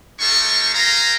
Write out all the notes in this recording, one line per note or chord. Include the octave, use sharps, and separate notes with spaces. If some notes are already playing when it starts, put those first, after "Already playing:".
G#3 D#4 F4 G4 A4 C#6
G#4 C5 F5 G5 A#5